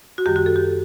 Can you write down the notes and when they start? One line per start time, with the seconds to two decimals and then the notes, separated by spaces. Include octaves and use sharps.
0.18 F#4
0.26 F#2 D#3 G3 G4
0.36 F#4
0.46 A4
0.56 G4